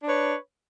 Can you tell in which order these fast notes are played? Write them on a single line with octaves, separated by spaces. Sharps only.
D4 C#5 B4